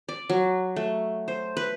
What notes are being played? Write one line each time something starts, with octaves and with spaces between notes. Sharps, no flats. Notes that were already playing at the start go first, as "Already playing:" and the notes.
D5
F#3
A3
C5
B4